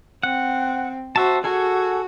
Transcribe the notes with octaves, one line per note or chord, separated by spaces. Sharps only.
C4 F#5
F#4 C5 E5 A5
F#4 G#4 A4 G#5